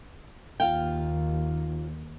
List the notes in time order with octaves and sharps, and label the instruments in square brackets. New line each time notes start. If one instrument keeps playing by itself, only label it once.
[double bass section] D#2 [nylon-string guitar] F4 F5 G5